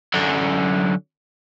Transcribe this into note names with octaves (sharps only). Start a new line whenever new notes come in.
F#2 D3